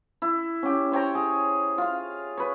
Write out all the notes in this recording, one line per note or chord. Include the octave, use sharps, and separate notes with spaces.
E4
C#4 G4
C5 C#5 G5 A#5
G#4
F4 F5
B4 C#5